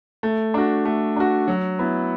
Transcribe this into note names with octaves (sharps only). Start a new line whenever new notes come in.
A3
D4 F#4
A3
D4 F#4
F#3
B3 E4